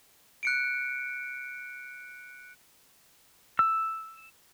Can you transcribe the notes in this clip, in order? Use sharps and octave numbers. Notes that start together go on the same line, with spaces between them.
F#6 C#7 D7
E6